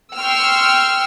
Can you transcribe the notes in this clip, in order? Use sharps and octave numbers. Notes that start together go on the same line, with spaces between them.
G5 C6 C#6 E6 F6